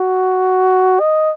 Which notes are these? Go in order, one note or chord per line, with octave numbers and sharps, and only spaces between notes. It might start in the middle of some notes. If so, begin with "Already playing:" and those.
Already playing: F#4
D#5